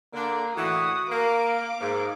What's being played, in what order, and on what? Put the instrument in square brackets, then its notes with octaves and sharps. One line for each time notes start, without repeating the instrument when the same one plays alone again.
[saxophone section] D3 D4 [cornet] A#3
[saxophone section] A2 D3 E3 [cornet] F#4 [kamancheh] D#6
[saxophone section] A#3 [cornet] A#4 [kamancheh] F5 D6
[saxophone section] G#2 [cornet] A#3